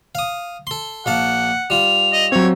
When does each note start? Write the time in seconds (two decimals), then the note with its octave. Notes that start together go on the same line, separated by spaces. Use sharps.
0.15 F5 D#6
0.67 A4 C6
1.06 A#1 F5 F#5 A5
1.70 G3 F4 F7
2.13 D#5
2.32 F#3 C4 C#5